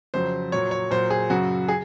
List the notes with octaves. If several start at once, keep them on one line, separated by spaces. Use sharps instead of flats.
F2 C#3 F#3 C5
A#2 F#3 C#5
C#5
A#2 F#3 C5
G#4
F#2 C#3 F#3 F#4
G#4